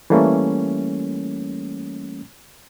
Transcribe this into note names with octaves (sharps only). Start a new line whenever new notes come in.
E3 G3 A3 A#3 C#4